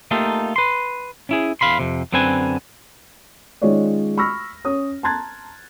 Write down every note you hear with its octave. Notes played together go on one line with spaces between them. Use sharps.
A3 A#3 D#4 F4 G4 A4
B4 C6
C#4 E4 G#4
E2 F5 B5 C6
F2 C3
F#2 D3 C4 B4 G#5
D#3 G#3 C#4 F4 C#5 D5
B5 C#6 E6 F6 A#6
C#4 C#5 D#6
A5 A#5 C6 F#6 G#6 A6